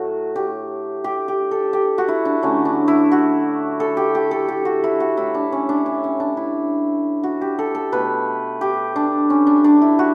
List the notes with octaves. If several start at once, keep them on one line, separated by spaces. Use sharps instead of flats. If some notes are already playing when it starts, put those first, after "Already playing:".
Already playing: A2 F#3 A3 F#4
G4
G4
G4
A4
G4
F#4
E4
D4
D3 F#3 A3 C#4
D4
E4
F#4
A4
G4
G4
A4
G4
F#4
E4
F#4
A2 G3 E4
D4
C#4
D4
C#4
C#4
D4
E4
F#4
G4
A4
A4
B2 A3 B4
G4
D4
C#4
D4
D4
E4
F#4